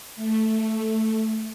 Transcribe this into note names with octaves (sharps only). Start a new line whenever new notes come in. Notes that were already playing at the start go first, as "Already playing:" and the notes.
A3